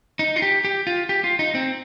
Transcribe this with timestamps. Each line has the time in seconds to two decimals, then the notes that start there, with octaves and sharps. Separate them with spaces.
0.19 D#4
0.36 F4
0.42 G4
0.64 G4
0.87 F4
1.09 G4
1.24 F4
1.39 D#4
1.55 C4